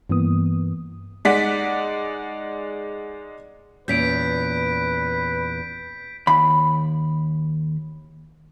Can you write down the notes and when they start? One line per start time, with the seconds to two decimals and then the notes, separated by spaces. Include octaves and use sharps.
0.09 G2 E3 A#3 B3 D#6
1.25 G#3 D#4 D5 F#5 B6
3.88 E2 A#2 C#4 B4 G6 B6 D7
6.27 D#2 B5